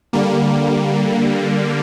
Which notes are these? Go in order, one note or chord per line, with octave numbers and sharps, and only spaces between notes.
D3 G3 A#3